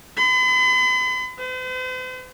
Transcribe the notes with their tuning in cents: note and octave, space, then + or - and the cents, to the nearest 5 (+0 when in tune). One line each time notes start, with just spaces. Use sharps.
B5 +45
C5 -45